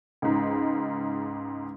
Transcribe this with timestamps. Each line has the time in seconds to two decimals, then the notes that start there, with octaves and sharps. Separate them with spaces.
0.22 C#2 G#2